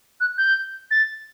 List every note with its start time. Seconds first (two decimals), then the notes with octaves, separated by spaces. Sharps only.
0.20 F#6
0.38 G6
0.91 A6